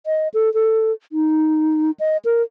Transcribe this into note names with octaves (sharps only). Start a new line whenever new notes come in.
D#5
A4
A4
D#4
D#5
A#4